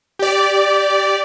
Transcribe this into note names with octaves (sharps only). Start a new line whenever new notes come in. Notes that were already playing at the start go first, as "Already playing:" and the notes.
G4 D5